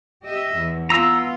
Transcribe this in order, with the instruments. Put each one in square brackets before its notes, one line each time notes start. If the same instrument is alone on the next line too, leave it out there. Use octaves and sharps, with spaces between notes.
[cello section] G4 D#5 E5
E2
[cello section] B3 F4 [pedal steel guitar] A#5 E6